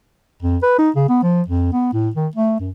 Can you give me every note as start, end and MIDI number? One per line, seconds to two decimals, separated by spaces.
0.42 0.57 41
0.63 0.74 71
0.79 0.90 63
0.96 1.05 49
1.09 1.21 59
1.23 1.42 53
1.48 1.69 41
1.73 1.92 59
1.93 2.09 45
2.15 2.28 51
2.35 2.57 57
2.59 2.70 42